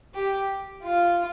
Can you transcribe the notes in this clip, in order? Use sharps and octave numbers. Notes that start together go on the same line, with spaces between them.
G4
F4